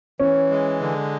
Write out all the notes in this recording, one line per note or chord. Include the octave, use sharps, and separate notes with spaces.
E3 C#4
G#3
D3